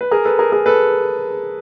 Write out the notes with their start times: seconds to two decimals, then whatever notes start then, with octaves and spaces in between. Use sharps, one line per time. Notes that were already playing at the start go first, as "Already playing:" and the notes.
0.01 B4
0.11 G#4 A#4
0.25 A4 B4
0.39 G#4 A#4
0.52 G#4 A#4
0.66 A4 B4